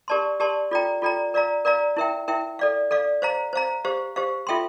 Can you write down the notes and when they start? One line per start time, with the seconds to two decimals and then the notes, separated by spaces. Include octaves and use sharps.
0.08 G4 A#4 D5 A5 C6
0.40 G4 A#4 D5 A5 C6
0.71 F4 A4 D5 G5 A#5
1.02 F4 A4 D5 G5 A#5
1.34 A#4 D5 F5 A#5
1.65 A#4 D5 F5 A#5
1.97 E4 A#4 E5 G5
2.28 E4 A#4 E5 G5
2.59 A4 D5 F5
2.91 A4 D5 F5
3.22 C5 F5 A#5
3.53 C5 F5 A#5
3.85 G4 C5 F5
4.16 G4 C5 F5
4.47 F4 A4 E5 G5 C6